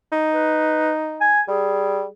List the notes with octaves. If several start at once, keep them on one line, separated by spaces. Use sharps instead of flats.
D#4
B4
G#5
G3 G#4